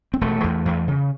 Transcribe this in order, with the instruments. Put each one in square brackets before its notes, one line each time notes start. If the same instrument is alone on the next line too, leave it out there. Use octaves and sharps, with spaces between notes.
[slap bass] C4
E1 A3
E2
E2
C#3